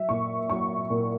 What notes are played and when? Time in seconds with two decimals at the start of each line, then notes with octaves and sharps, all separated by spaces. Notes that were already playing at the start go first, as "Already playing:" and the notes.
Already playing: F#3 E5
0.09 A#2 C#6
0.50 F#3 C#6
0.90 A#2